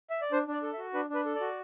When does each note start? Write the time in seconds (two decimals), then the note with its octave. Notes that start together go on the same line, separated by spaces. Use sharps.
0.10 E5
0.21 D5
0.32 D4 C5
0.48 D4 D5
0.63 A4
0.74 E5
0.78 F#4
0.94 D4 B4
1.10 D4 B4
1.25 A4
1.35 D5
1.40 F#4